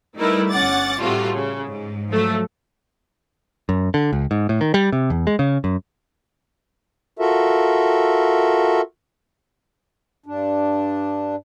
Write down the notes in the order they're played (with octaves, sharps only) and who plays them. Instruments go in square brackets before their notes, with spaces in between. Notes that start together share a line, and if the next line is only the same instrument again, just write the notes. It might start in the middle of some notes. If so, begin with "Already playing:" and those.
[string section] G3 A3 D#4 E4 A#4 B4
G1 C#4 F#5 D6 A6
A2 C3 G3 A3 F4 F#4
C#3
G#2
F3 F#3 A3
[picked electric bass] F#2
D3
C#2
G#2
A2
D#3
G3
C3
E2
G#3
C#3
F#2
[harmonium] F4 F#4 A4 A#4 E5
G2 D4